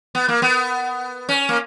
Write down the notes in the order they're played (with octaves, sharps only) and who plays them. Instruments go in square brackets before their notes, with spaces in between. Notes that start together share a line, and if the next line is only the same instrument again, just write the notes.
[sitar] B3
A#3
B3
C#4
A#3